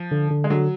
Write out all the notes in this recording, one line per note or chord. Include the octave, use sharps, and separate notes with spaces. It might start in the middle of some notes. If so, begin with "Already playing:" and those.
Already playing: F3
D3
D3
G#3
D3 F#3